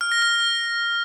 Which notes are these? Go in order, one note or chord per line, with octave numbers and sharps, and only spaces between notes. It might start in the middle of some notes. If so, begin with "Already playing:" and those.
F6
A#6
F6